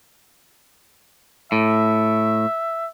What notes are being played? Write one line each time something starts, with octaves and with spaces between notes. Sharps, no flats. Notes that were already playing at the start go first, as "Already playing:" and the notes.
A2 E5